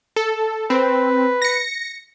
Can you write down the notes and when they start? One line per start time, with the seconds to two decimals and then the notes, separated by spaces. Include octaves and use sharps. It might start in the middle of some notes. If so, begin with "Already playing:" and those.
0.16 A4
0.70 C4 B4
1.42 A#6 C#7